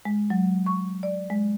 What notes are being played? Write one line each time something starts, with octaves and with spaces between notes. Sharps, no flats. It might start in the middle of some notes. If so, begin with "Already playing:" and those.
G#3
F#3
C#6
D5
G#3